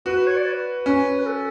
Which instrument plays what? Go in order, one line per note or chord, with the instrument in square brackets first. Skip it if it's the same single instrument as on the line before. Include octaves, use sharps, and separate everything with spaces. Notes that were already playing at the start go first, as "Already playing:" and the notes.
[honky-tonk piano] F#4 [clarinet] B4
[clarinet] B4
C#5
D5
B4
[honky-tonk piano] C#4
[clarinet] B4
A4